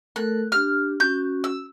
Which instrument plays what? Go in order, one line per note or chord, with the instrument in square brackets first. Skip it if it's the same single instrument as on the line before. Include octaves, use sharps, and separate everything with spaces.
[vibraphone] A3 A4 A#4 [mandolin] F#6
[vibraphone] D4 G4 [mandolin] F6
[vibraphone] C#4 F#4 [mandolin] G6
[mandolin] E6